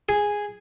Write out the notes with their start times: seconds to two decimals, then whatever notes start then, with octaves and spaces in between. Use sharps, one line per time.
0.09 G#4